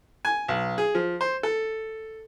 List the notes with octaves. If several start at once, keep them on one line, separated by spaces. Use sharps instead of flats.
G#5
B1
G#4
F3
C5
A4